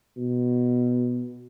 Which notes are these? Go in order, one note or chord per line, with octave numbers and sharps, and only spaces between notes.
B2